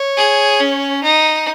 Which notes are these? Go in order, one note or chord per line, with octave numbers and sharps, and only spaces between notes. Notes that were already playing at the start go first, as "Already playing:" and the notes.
Already playing: C#5
G#4
C#4
D#4